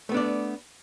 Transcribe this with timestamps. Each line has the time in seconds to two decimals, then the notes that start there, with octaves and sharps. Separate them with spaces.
0.09 A3
0.12 B3
0.14 D4
0.17 D5